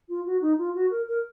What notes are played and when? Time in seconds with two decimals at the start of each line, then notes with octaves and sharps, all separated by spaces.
0.09 F4
0.26 F#4
0.41 D#4
0.58 F4
0.75 F#4
0.91 A#4
1.07 A#4